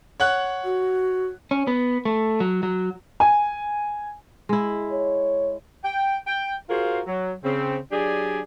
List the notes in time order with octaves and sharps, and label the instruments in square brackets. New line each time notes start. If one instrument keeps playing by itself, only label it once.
[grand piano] C#5 F#5 F#6
[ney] F#4
[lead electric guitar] C#4
B3
A3
F#3
F#3
[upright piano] G#5
[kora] G#3 E4
[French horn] C#5
[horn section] G5
G5
F4 F#4 G#4 A#4 C5 F5
F#3
C#3 C4
F#3 D4 G4 G#4 D5 G#5